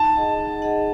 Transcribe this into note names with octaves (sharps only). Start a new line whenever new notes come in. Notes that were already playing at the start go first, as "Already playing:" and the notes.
Already playing: D#4 A5
G#4 D#5 F#5
D#4
G#4 D#5 F#5